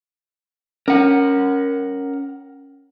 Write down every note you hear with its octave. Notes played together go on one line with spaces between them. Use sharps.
C#4 A#4 F#5